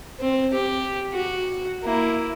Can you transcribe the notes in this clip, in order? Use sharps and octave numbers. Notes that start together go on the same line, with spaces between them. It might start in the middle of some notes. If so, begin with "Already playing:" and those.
C4
G4
F#4
A#3 E4